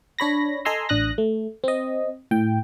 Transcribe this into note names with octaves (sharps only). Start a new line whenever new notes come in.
D4 C#5 B5 A#6
A4 D#5 G#5 A#5 C6 E6
A1 D4 D#6 F#6 A#6
A3
C4 D#5
A2 G5